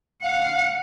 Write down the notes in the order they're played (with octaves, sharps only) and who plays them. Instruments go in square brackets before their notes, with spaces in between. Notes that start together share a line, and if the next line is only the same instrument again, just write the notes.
[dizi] F5 [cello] F#5